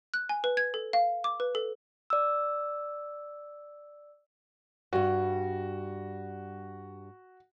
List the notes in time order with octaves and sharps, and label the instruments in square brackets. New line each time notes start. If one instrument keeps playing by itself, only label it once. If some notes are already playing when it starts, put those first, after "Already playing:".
[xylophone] F#6
G#5
B4
G#6
A4
F5
D6
B4
A4
[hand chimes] D5 E6
[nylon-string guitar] G2 G3 [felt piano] F#4